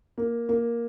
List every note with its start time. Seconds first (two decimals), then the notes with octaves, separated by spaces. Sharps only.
0.18 A#3
0.49 A#3